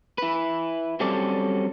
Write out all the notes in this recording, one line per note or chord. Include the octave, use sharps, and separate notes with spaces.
E4 B4
F#3 G3 C4 C#4 A4 D5